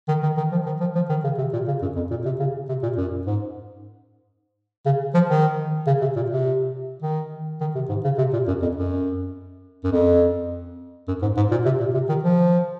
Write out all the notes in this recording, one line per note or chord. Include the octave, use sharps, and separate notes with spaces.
D#3
D#3
D#3
F3
D#3
F3
F3
D#3
C#3
C3
A#2
C#3
F#2
F2
A#2
C3
C#3
C3
A#2
F#2
G#2
C#3
F3
D#3
C#3
C3
A#2
C3
D#3
D#3
C3
G#2
C#3
C3
A#2
F#2
F2
F#2
F#2
F2
F#2
G#2
G#2
A#2
C3
A#2
C3
D#3
F3